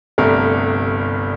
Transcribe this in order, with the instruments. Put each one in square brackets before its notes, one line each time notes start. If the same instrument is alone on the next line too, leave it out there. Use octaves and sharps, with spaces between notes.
[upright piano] G1 C2 G2 A3 A#4